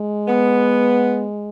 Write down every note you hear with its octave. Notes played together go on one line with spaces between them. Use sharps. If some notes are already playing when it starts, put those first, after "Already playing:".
Already playing: G#3
B3